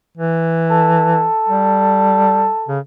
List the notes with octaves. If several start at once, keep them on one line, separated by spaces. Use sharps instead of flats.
E3
A4
G3
C#3